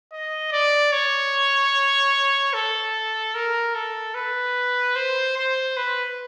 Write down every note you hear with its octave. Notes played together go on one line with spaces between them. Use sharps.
D#5
D5
C#5
A4
A#4
A4
B4
C5
C5
B4